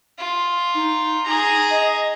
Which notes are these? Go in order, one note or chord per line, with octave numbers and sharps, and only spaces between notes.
F4
D#4
G#4 A#5
D#5